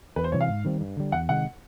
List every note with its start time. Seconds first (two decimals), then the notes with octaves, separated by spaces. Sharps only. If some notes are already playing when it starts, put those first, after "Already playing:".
0.16 E2 B4
0.24 C5
0.32 C3 E3 G3 C#5
0.41 F5
0.49 G#2
0.65 D#3 G3 C4
0.81 G2
0.97 D3 G3
1.12 E2 F#5
1.29 C3 D#3 G#3 F#5